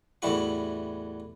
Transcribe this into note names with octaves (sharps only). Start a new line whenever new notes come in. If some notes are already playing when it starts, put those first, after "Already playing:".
E2 A2 G3 E4 F#4 C#6